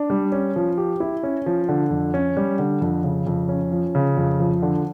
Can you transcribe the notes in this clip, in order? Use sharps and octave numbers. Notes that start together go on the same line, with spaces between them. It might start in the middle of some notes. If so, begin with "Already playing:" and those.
Already playing: D4
G3
C#4
F3
G4
E4
C#4
F3
D3
F2
C#4
G3
D3
F2
C#3
F2
C#4
F3
C#3
F2
F3
D3